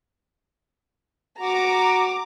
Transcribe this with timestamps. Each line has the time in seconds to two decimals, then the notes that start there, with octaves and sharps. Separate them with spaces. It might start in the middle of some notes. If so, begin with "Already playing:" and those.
1.40 F#4 A#5 D6